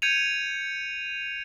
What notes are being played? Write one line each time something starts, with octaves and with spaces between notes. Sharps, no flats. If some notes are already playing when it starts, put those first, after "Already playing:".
G6 G#6 C#7 D#7 F7